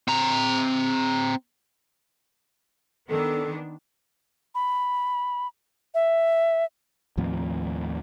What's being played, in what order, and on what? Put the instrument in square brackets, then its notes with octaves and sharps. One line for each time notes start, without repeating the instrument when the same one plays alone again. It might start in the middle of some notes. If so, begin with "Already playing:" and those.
[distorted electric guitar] C4 A#5
[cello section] D#3 B3 D4 [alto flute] A4
[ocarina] B5
E5
[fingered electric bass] D#2 A2 F3 C4